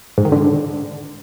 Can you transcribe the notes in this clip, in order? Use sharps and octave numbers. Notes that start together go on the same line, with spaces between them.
G#2
D#3
D3